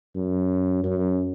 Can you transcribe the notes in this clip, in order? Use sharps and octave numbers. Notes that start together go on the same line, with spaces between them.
F#2
F#2